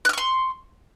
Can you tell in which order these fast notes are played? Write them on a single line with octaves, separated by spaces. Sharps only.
F#6 F6 C#6 C6